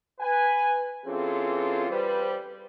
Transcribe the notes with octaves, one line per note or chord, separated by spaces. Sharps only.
B4 G#5
E3 C4 C#4 F4 G#4 A4
G3 B4 C5